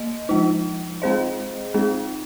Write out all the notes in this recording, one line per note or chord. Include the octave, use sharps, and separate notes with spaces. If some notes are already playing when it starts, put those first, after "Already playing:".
Already playing: A#3 D#5
F3 G#3 D#4
G#3 C4 G#4 C5 D#5
G#3 C4 D#4 G#4